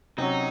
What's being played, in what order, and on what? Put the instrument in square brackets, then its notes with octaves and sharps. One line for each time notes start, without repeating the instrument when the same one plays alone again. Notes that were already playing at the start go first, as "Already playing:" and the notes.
[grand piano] C3 F#3 C#4 F#4 [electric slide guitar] D#4